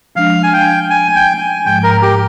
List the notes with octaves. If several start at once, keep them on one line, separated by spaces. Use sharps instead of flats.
F3 G#3 D4 F5
G#5
G5
G#5
G5
G#5
G#2 F3 G#3 G5
A#4
G4